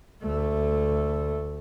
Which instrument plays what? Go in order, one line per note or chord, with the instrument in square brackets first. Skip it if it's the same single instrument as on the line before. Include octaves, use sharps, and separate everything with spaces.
[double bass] D2 A3